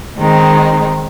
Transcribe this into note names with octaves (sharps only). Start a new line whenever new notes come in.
D#3 G#3 C4 D#4